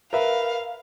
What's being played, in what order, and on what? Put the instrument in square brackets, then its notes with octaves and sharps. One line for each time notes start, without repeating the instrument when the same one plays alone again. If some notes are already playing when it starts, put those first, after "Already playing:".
[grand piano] A#4 B4 E5 [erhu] F5